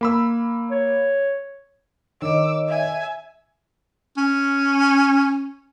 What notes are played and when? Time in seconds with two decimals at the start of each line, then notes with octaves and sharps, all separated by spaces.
0.01 A#3 B5 E6
0.71 C#5
2.22 D#3 C#5 D#5 D6 E6
2.68 E5 G#5
4.17 C#4